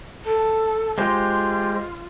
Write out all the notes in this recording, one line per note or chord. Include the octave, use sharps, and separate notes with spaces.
A4
G#3 F4 G4 C5